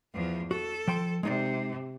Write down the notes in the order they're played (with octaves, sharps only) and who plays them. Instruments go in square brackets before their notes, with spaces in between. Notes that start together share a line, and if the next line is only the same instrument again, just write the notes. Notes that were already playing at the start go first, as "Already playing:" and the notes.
[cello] E2 F3
[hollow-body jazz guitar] F#4 [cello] A4
[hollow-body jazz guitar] F3 G5 C6
[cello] C3 [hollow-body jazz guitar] G#3 D#4 D5